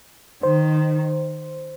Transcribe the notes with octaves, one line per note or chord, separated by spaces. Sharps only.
D#3 C5